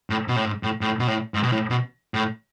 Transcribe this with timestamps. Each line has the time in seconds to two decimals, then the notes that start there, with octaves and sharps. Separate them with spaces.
0.10 A2
0.28 B2
0.36 A2
0.45 G#2
0.63 A2
0.81 A2
0.99 B2
1.08 A2
1.34 G#2
1.43 B2
1.52 A2
1.70 B2
2.14 A2